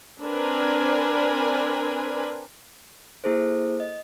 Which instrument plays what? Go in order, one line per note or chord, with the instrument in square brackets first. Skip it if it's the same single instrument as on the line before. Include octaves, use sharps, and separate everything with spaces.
[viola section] C4 D4 A#4 B4 G#5
[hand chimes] A#3 E4 G#4 A4 C5
D#5